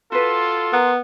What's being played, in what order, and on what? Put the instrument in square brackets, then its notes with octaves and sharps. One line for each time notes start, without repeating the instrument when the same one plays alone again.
[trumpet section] F4 A4 [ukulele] F#4 B4 [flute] C6
[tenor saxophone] B3 [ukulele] A#4